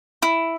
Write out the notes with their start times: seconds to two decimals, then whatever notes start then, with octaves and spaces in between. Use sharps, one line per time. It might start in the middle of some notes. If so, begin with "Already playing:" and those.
0.22 E4